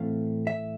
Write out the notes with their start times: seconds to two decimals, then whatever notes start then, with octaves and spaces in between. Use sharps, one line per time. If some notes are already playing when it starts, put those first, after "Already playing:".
Already playing: A2 E3 A3 C4 F5
0.47 E5